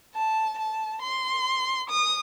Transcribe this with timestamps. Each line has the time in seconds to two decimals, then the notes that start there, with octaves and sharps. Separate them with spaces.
0.14 A5
0.58 A5
1.02 C6
1.90 D#6